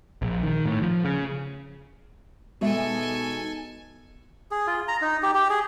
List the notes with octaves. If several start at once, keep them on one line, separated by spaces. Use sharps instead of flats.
A#1
D#3
A2
F3
C#3
B2 G#3 D#4 A4 E5 G#5
G#4
F4
A#5
D#4
G4
G4
G#4